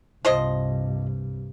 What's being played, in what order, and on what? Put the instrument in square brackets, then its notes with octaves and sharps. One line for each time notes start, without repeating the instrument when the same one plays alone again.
[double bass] C2 G2 [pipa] F3 C5 D#5